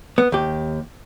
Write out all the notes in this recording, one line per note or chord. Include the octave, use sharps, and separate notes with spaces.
B3
D#2 G4